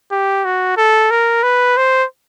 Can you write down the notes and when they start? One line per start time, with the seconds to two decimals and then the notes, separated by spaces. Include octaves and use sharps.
0.12 G4
0.45 F#4
0.77 A4
1.11 A#4
1.43 B4
1.77 C5